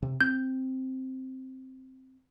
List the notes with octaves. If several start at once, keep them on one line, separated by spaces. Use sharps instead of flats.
C3
C4 G6